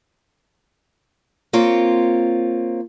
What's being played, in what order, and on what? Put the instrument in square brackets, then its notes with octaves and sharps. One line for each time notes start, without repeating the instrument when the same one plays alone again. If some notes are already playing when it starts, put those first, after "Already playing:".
[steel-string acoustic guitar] A#3 C4 F4 C#5